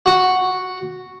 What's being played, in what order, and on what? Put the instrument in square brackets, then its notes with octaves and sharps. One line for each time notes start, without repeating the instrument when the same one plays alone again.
[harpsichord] F#4